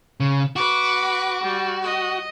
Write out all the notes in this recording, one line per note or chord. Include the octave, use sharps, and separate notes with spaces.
C#3
F#4 B4 D6
G3
D#5